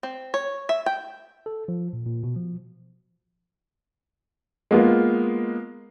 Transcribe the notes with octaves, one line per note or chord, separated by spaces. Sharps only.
C4
C#5
E5
G5
A4
F3
A#2
A#2
B2
F3
G#3 A#3 B3 F4